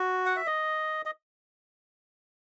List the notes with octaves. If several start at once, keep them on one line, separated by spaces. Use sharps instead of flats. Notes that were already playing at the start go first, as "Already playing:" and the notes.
Already playing: F#4
F#5
E5
D#5
D#5